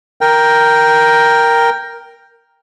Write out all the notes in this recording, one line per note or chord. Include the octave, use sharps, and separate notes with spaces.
A#4 G5